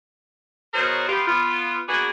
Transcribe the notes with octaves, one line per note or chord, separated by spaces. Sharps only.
B2 F#3 G#4 A#4 C5 C#5
B3 F4 G4
B3 F4
A#3 B3 D4 F#4 G#4